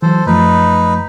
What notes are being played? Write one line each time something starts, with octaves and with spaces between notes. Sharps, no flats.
E3 F#3 A4 C5
F#2 F3 A3 D#4 B4